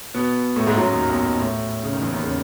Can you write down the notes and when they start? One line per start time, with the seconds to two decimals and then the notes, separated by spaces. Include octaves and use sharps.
0.14 B2 B3
0.56 A2 A3
0.67 G#2 G#3
0.77 F#2 F#3
0.93 D#2 D#3
1.09 B1 B2
1.39 A2
1.83 C#3
1.93 D#3
2.02 E2 E3
2.12 D#2 D#3
2.23 C#3